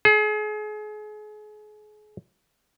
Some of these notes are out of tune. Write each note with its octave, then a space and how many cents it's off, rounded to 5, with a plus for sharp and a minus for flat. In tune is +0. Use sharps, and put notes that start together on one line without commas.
G#4 +35